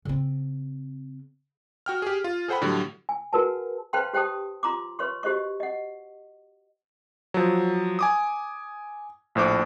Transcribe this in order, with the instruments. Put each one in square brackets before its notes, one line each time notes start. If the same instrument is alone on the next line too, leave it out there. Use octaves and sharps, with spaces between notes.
[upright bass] C#3 C4
[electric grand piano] F#4 G5 F6
G4 G#4
F4
G#4 A4 C5 F#5 G5 B5
A2 D3 F#3 G3
[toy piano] G#5
F#4 G#4 A#4 B4 F#5 A5
B4 C5 F5 G5 A5 C6
G4 C5 G5 A5 D#6
F4 A#5 C6 D6
B4 C#5 C6 C#6
F#4 G4 C5 D#5 C#6
D#5 F#5
[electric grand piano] F3 F#3
G#5 D6 D#6
A#1 A2 C5 D6